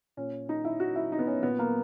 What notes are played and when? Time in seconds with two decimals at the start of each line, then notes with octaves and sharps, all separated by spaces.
0.17 A#2 C#4
0.49 D#4
0.65 E4
0.80 F#4
0.96 E4
1.12 D#4
1.19 B3
1.27 C#4
1.43 A#2 B3
1.59 A#3